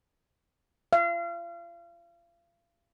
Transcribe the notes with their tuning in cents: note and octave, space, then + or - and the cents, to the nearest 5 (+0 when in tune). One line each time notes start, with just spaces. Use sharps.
F5 -35